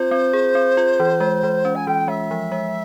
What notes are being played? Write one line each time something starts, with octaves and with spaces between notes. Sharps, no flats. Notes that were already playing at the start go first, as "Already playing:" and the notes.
Already playing: C4 F4 C5
C4
G#4
C4
F4
E3
G#3
E3
C#4
G#5
E3 G5
G#3 E5
F3
G#3